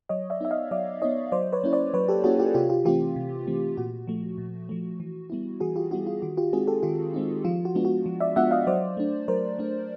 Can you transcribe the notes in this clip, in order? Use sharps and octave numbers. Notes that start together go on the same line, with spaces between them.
F#3 C#5 D#5
D5 E5
B3 D#4 E5
D#5 F5
F#3 D5 E5
B3 D#4 C#5 D#5
F#3 C5 D5
B4 C#5
A#3 C#4 E4
C5 D5
F#3 B4 C#5
G4 A4
A#3 C#4 E4 F#4 G#4
F4 G4
C3 F4 G4
F4 G4
E3 A3 C4 F4 G4
C3
E3 A3 C4
A#2 F#4
F3 A3
A#2
F3 A3
E3
G3 B3 E4
E3 F#4 G#4
F4 G4
G3 B3 E4 F#4
F4
D#3 F#4
F4 G4
G#3 C4 D#4 F#4 G#4
G4 A4
D#3 F4 G4
G#3 C4 D#4
F3 F4
F#4
G#3 B3 D4 F4
F#4
F3
D5 E5
G#3 B3 D4 F4 E5 F#5
D#5 F5
F#3 C5 D5
A3 D4
F#3 A#4 C5
A3 D4